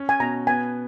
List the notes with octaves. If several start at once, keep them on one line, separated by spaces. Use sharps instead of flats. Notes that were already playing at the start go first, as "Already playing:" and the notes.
Already playing: C#4
G#5
B2 A#5
B3 G#5